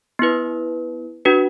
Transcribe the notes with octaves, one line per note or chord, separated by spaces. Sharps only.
B3 E4 B4
D4 F#4 B4